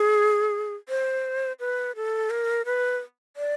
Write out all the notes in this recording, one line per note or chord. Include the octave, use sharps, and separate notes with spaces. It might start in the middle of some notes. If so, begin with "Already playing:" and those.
Already playing: G#4
C5
B4
A4
A#4
B4
D5